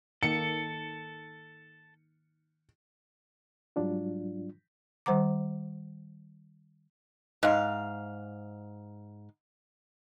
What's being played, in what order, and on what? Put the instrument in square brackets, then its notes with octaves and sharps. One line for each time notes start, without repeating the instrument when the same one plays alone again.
[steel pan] D#3 A#3 [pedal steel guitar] A4 [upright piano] C#7
[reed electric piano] G#2 F#3 G3 D4 F4
[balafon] D#3 G3 C5 F#5 A#5 D6
[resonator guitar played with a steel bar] G#2 F5